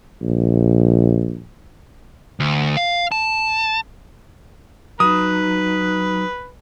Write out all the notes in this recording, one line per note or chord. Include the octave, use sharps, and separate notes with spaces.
A#1
D2
F5
A5
F#3 D#4 B4 D#6